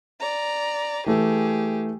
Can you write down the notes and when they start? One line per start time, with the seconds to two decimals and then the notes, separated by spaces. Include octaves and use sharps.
0.20 D5 A#5
1.06 E3 A3 G4 G#4